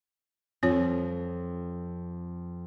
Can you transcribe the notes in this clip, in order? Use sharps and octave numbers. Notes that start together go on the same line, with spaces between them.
F2 C4 F4 C#5